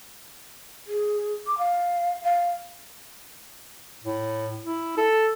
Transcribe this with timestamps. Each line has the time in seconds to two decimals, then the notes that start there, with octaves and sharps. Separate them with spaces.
0.87 G#4
1.47 D6
1.58 F5
2.23 F5
4.04 A2
4.66 E4
4.97 A4